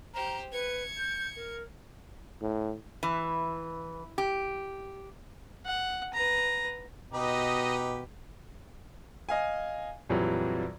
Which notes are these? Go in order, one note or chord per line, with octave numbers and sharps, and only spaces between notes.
G4 C5 A#5
B4 G#6 C#7
G6
A#4
A2
E3
G4
F#5
B4 A#5
B2 D#4 G4 B4 D#5
D#5 F5 G#5
A#1 F2 E3 F#3 G3